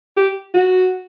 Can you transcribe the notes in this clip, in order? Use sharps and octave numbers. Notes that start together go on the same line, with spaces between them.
G4
F#4